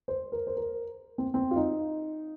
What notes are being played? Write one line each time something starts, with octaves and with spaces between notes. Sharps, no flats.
C5
A#4
C5
A#4
C4
C4
F4
D#4